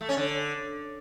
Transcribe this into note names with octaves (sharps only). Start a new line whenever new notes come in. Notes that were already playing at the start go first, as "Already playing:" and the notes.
A3
C#4
D3